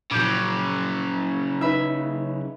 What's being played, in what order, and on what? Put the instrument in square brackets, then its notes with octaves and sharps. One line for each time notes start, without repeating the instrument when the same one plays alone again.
[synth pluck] A#2 F3 [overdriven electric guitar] C#3 F#3 [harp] D6 G6
[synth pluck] D#4 B4 [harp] E5 B5